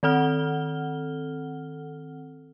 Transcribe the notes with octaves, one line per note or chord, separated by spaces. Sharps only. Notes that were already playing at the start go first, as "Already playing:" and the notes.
D#3 C4 A4 F#5 F6 G7